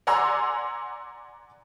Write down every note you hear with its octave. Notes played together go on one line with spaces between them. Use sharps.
D5 F#5 G#5 A#5 C6 E6